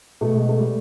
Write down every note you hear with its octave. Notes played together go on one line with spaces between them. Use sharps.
B2 A3
G#3
A3
G3